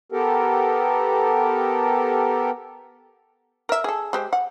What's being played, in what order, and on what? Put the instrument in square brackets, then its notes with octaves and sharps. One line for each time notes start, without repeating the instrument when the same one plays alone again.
[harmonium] B3 G4 A4 A#4
[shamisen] A#4 E5
G#4 A4
G#3 G4 C5
F#5